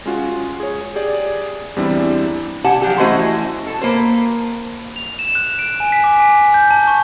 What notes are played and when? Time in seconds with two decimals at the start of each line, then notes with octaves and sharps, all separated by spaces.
0.06 G#3 C#4 F4 F#4
0.60 G#4 C#5
0.95 G4 G#4 D5
1.76 E2 G3 C4 D4 E4
2.64 G4 F#5 G#5 A5
2.82 F3 F#3 G4
2.99 E3 A3 C#4 F#4 C5 D#5
3.67 A4
3.81 A#3 B4 C5
4.96 F7
5.19 E7
5.35 F#6
5.59 D7
5.80 G#5
5.92 B6
6.04 D6
6.20 G#5
6.54 G6
6.71 A5
6.87 C#6